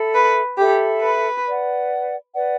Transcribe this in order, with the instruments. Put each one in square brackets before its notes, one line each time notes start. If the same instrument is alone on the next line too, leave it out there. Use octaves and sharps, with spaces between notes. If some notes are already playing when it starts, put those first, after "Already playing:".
Already playing: [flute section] A4 E5 B5
[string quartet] B4
[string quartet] G4 [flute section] A4 E5 B5
[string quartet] B4
[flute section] B4 D5 F#5
B4 D5 F#5